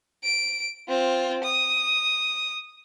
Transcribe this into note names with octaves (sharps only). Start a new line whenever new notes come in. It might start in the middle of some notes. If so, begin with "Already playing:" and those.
D7
C4 F4
D#6